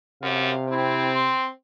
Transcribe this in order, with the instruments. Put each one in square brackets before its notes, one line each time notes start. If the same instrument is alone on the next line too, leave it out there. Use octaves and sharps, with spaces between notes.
[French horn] F#2 [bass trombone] C3 [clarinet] F5
[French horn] C4 [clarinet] E4
[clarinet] C6